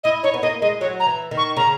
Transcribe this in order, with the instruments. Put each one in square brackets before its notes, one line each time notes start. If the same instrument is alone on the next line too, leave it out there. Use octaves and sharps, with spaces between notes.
[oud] E4 [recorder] D#5
[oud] D#4 [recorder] C#5
[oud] B3
[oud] A#3 [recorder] D#5
[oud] G#3 [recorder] D#5
[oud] F#3 [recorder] C#5
[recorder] A#5
[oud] E3
D#3
[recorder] C#6
[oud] C#3 [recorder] A#5